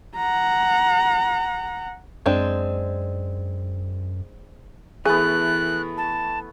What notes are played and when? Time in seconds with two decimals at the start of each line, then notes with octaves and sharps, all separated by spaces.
0.16 F#5 A#5
2.26 F#2 G#3 C4 D4
5.06 E3 A3 B3 G#4 F#6
5.97 A5